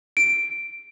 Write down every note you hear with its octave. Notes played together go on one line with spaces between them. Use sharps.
D7